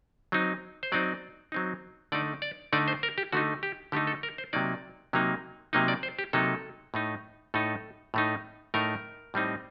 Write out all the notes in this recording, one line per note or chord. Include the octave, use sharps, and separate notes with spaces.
F#3 C4 D#4
C5
F#3 C4 D#4 D5
F#3 C4 D#4
D3 A3 D#4 D5
D5
D3 A3 D#4 D5
C5
A#4
G4
D3 A3 D#4 F#4
G4
D3 A3 D#4 G4
A4
A#4
C5
C3 F#3 A#3 D#4 D5
C3 F#3 A#3 D#4
C3 F#3 A#3 D#4 D#5
D5
C5
G4
C3 F#3 A#3 D#4 A4
A2 A3 D#4
A2 A3 D#4 A4
A2 A3 D#4
A2 A3 D#4 A#4
A2 G3 C4 D#4